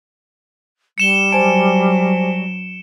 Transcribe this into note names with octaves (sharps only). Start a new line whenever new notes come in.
G3 C#7 E7 G7
F#3 C5 G#5 A5 D7